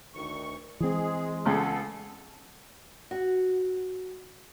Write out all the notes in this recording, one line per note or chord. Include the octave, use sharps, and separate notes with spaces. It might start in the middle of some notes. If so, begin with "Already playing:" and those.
D2 D#3 C#6
E3 G#3 C4 G#4
C#2 C#3 B3 A4
F#4